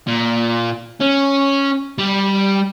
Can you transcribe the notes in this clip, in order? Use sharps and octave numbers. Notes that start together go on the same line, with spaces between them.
A#2
C#4
G3